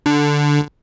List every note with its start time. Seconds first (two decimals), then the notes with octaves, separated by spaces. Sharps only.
0.06 D3